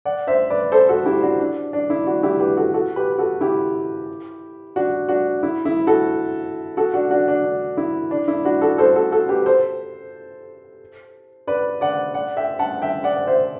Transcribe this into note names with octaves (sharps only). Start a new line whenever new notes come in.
D5 F#5
C5 E5
B4 D5
A4 C5
F#4 A4
E4 G4
D4 F#4
D4
D4
E4
D4 F#4
E4 G4
G4 B4
F#4 A4
F#4 A4
G4 B4
F#4 A4
E4 G4
D4 F#4
D4 F#4
E4
E4
F#4 A4
F#4 A4
D4 F#4
D4 F#4
D4
D4
E4
D4
E4
D4 F#4
F#4 A4
A4 C5
F#4 A4
F#4 A4
G4 B4
A4 C5
B4 D5
D5 F#5
D5 F#5
E5 G5
F#5 A5
E5 G5
D5 F#5
C5 E5